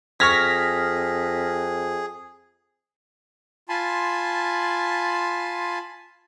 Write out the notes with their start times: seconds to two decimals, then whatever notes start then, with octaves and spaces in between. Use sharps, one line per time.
0.20 F2 G#4 C#6 F6 G#6 A#6 B6
3.69 F4 G#5 A5 B5 C6